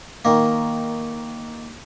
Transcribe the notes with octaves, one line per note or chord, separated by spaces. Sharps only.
D#3 A#3